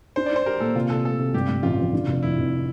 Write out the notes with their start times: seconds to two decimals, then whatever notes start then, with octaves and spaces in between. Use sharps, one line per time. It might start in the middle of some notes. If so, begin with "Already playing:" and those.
0.16 D4 C5
0.26 D5
0.32 D4 C5
0.46 G4 A#4
0.60 A#2 A4
0.75 C3 F4
0.90 C3 A4
1.04 A3 A4
1.19 C3
1.34 G2 G4
1.49 G2
1.63 A1 F4
1.78 F3
1.93 D3
2.07 F1
2.23 F2 E4
2.38 F1